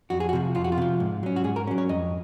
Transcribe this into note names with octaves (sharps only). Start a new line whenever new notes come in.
F2 F#4
G#4
F#4
C3 F3
F2 F4
F#4
F4
C3 F3
G#2
F#3 C#4
F#4
G#2 G#4
A#4
F#3 C#4
C#5
F2 D#5